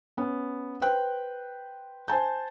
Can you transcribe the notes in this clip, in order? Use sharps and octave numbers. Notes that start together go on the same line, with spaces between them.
B3 C#4
B4 C5 G5 F#6
C5 G#5 A5 G6